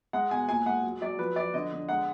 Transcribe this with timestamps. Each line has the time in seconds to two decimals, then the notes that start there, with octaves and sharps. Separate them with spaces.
0.13 G#3 F#5
0.31 B2 G#5
0.48 A#2 G#5
0.66 G#3 F#5
0.83 F#3
1.01 F#3 D5
1.18 F3 B4
1.36 F3 D5
1.54 D3 D#5
1.72 D3
1.89 G#3 F#5